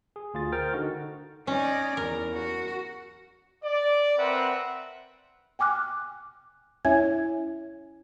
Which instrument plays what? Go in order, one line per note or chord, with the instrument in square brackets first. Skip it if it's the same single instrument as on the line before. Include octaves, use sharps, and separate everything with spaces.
[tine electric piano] G#4
D2 F4 G#4 A6
A#4 C5 G5 F6 A6
D3 D#4 F#4
[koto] C#4 [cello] D#4 D5
[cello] E2 [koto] A#4
[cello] F#4
[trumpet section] D5
C4 A#4 B4 E5 F#5
[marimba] G5 G#5 D6 F6 F#6
C#4 E4 C#5 E5 G#5 G#6